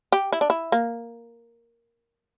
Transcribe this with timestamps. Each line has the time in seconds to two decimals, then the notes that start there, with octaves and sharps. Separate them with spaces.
0.12 G4
0.33 E4
0.41 D4
0.50 E4
0.72 A#3